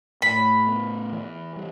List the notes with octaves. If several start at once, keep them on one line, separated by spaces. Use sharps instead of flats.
A2 B5
B3
E3
G3